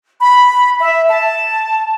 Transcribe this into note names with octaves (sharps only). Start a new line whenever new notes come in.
B5
E5
A5